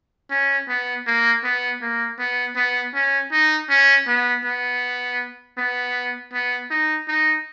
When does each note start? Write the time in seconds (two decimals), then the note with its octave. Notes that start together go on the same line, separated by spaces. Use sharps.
0.31 C#4
0.68 B3
1.06 A#3
1.44 B3
1.82 A#3
2.19 B3
2.56 B3
2.94 C#4
3.32 D#4
3.70 C#4
4.07 B3
4.45 B3
5.58 B3
6.33 B3
6.71 D#4
7.08 D#4